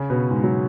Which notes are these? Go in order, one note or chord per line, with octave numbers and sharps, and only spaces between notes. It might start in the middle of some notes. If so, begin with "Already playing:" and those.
Already playing: C#3 C#4
B2 B3
G#2 G#3
F#3